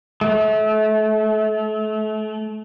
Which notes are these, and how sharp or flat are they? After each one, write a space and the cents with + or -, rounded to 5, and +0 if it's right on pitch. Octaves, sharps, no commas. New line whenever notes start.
A3 -30